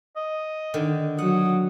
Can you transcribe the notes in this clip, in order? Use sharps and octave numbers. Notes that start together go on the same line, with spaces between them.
D#5
D3 D#3
F#3 F#5 D#6